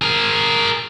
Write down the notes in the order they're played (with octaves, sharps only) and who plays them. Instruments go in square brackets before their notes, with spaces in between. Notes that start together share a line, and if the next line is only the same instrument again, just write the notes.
[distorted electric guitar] G#4 A#4